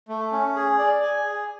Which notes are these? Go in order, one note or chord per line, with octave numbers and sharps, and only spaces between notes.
A3
C#4
G#4
D5
G#5
G#4